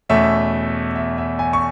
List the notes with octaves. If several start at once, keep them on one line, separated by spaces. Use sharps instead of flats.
E2 B2 A3 C#4 E5
E5
E5
G#5
C#6